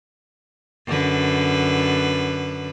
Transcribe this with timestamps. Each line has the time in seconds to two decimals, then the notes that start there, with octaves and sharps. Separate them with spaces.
0.87 F#2 D3 B4